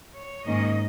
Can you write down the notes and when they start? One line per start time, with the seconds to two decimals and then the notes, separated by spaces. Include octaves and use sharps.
0.17 C#5
0.45 G#2 D#3 A#3 C#4 D#5